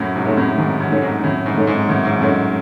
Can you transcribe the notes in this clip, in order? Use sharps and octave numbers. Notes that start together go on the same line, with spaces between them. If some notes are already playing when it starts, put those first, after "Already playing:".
Already playing: F#2 A2
G#2 C3
A3 D#4 A4 C#5
F#2 A2
G#2 D#3
F#2
A3 D#4 A4 C#5
G#2
F#2 A2 D#3
G#2
A3 D#4 A4 C#5
G#2
F#2 A2 D#3
G#2
F#2 A3 D#4 A4 C#5